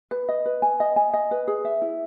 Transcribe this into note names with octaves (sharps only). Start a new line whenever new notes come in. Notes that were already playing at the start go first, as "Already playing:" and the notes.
B4
D#5
B4
G#5
D#5
G#5
D#5
B4
G#4
E5
E4